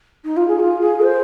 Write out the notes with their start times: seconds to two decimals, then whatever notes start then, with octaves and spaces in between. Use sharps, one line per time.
0.24 D#4
0.36 F4
0.47 G#4
0.59 F4
0.81 G#4
1.04 C5